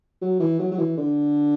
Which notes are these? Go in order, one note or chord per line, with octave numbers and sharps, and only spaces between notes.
F#3
E3
F#3
F#3
E3
D3